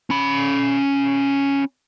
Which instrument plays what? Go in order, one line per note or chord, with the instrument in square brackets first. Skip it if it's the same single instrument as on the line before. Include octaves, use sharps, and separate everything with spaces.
[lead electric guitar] C#4 B5